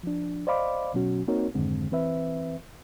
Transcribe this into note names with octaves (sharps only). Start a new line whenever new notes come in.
F3 D4
C5 D5 D#5 F5 B5 D6
B2 F#3 C#4 F#4
A#3 C4 D#4 F#4 A#4 C#5
F2 G#2 D3 D#3 G#3 C4
E3 C4 B4 E5